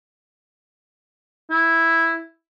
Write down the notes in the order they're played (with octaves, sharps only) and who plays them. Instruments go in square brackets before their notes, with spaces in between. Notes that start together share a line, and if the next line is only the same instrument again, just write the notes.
[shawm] E4